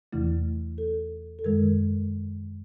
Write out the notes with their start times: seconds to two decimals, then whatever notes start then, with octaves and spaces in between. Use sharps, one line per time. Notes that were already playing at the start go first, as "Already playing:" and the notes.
0.13 E2 C3 E3 A3 E4
0.78 A4
1.39 A4
1.44 F#2 D#3 G#3 A#4